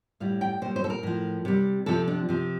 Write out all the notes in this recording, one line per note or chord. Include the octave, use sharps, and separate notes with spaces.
A2 G3 F5
G5
A#2 G3 C5
C5
A4
A#4
A2 F3
C3 G3
C3 F3 A4
D4
C3 F3